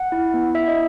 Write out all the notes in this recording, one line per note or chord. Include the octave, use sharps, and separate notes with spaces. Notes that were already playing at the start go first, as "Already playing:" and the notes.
Already playing: F#5
E4
B3
E4 E5
D#5